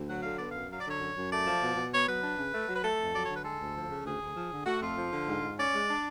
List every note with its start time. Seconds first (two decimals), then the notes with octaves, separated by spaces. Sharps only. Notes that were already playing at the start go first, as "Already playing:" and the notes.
Already playing: D2
0.08 F#3 F#5
0.22 D3 F5
0.36 B3 D5
0.50 F#2 F5
0.69 F#3 F5
0.79 D5
0.85 D3 C#5
1.00 F#2
1.15 F#2
1.30 A3 D5
1.46 F3
1.61 B2
1.76 B2
1.92 B3 C#5
2.07 F#3 B4
2.22 D4
2.37 C#3
2.53 A3
2.68 F#3
2.74 B4
2.83 A3 A4
2.98 F2
3.13 F#3 D5
3.24 C#5
3.29 D3 B4
3.44 G#3 A4
3.59 D2
3.74 F3
3.89 C#3
4.05 D2 G#4
4.21 D2
4.35 F3
4.51 D3
4.66 A3 F#4
4.81 F2 F4
4.97 F3
5.12 D3
5.27 G#2
5.42 G#2
5.57 C#4 D5
5.73 G#3
5.88 D4